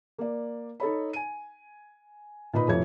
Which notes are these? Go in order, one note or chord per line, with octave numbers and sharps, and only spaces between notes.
A#3 D5
D#4 A4 C#5 B5
G#5 D#7
A#2 D#4 B4 D#5 B5
F1 F2 F3 E4 C#5 G#6